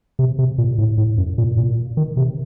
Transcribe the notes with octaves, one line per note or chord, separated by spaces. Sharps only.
C3
C3
A#2
A2
A2
F#2
A#2
A#2
D#3
C3